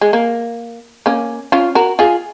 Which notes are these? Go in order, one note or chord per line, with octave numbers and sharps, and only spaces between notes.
G#3
A#3
A#3 C#4
C#4 F4
F#4 A#4
F4 G#4